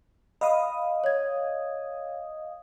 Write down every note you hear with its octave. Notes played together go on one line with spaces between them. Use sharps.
D#5 F5 B5 D#6
C#5 G#6